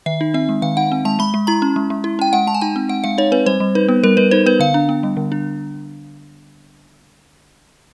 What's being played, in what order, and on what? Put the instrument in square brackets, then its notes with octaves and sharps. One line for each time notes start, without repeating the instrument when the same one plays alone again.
[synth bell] D#3 E5
D#4
C4 E5
G#3
D#3 F5
D#4 F#5
C4
G#3 A5
G#3 B5
G#3
E4 A#5
C#4
G#3
G#3
E4
C#4 G5
G#3 F#5
G#3 A5
G#5
D#4 G5
C4
G#3 F#5
G#3 F5
D#4 C#5
C4 B4
G3 C5
G3
D#4 B4
B3
G3 A#4
G3 B4
D#4 C5
B3 B4
D3 F5
D4
B3
G3
D3
D4